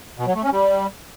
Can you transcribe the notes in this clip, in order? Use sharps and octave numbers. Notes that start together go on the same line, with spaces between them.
B2
F#3
A3
C#4
G3